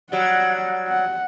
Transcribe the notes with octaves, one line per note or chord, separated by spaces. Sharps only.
F#3 G3 F#5
F#5